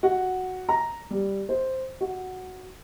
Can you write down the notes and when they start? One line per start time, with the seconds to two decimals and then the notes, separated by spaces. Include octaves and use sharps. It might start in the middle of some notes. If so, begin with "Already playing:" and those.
0.03 F#4
0.69 A#5
1.10 G3
1.49 C5
2.01 F#4